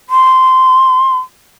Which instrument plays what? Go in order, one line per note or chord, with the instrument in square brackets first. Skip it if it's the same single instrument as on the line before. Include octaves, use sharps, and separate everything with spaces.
[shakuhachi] C6